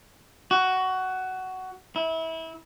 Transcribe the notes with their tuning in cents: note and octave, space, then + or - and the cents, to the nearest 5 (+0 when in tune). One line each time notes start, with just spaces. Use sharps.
F#4 +15
E4 -25